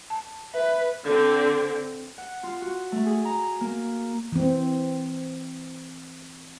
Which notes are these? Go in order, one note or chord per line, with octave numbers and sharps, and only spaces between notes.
A5
B4 E5
D3 C4
F#5
F4
F#4
A3
G#4
A#5
A#3
E3 C4